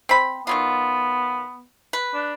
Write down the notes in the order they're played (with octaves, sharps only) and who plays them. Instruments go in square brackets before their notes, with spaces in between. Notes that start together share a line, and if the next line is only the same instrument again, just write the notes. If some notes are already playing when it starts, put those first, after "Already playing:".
[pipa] C4 B5
[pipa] D#3 F#3 F4 [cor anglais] B3
[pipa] B4
[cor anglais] D4